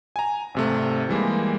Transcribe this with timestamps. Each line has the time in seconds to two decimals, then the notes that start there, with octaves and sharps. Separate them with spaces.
0.16 G#5 A#5
0.55 G#1 C3 A3
1.09 E3 G3 G#3 A#3